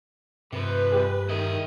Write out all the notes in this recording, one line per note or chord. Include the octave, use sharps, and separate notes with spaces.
G2 C3 F3 B4
G3 G4 G#4
D#3 E4 D#5